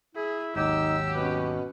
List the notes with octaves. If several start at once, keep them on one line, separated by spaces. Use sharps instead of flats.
E4 G#4
G#1 D#2 F#3 D#4 G4 E6
B2 C#4 B4